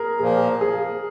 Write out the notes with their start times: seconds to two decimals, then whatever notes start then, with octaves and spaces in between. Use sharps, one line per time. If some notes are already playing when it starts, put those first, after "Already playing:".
Already playing: G#4 A#4
0.19 A#2 F3 A#3 G#4
0.61 G#4